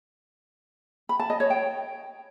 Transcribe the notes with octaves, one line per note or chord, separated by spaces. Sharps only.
B5
A5
D#5
C#5
G5